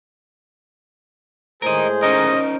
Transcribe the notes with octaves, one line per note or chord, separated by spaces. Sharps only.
A2 G#3 G#4 A#4 C5 D#5
C#4 D#4 A#4 D#5